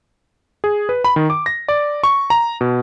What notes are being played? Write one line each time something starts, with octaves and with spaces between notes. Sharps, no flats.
G#4
B4
B5
D#3
D6
A#6
D5
C#6
A#5
B2